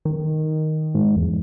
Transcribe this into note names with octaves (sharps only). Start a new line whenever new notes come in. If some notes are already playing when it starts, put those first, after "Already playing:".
D#3
G#2
E2